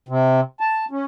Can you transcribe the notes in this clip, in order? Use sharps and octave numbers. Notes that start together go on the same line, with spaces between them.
C3
A5
C#4